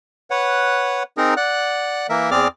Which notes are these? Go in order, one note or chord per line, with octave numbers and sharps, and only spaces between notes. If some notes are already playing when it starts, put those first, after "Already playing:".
B4 C#5 F#5
C4 D#4 G#4 A#4
D5 F#5 F#6
E3 A#3 A#4 E5
E2 C4 G#4 D5 D6 F6